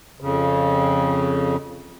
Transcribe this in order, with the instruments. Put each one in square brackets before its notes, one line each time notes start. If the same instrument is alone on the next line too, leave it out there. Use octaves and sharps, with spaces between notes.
[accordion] F2 C#3